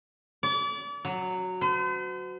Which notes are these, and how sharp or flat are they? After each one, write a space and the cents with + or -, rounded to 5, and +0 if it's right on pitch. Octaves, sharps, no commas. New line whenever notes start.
D5 -35
F#3 -5
C5 -45